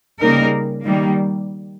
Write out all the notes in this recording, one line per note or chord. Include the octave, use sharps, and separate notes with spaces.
C#3 G3 A#3 D#4 A#4
D#3 G3 A#3